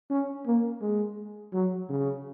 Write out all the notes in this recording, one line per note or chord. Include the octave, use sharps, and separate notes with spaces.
C#4
A#3
G#3
F#3
C#3